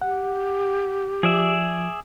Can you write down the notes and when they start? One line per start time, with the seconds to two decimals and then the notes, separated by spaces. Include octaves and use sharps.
0.02 G4 F#5
1.23 F3 G#4 D5 E5